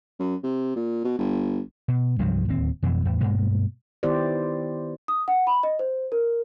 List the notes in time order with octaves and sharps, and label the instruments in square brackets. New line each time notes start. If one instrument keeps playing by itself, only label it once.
[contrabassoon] F#2
C3
A#2
B2
G1
[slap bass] B2
C2 G2 F3 F#3
D1 D#2 C4
F2 B2 E3
E2 A2
G2 B2 G#3 A#3
[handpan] D#3 B3 E4 G4 C5 D5
[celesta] D#6
F#5
B5
D#5
C5
A#4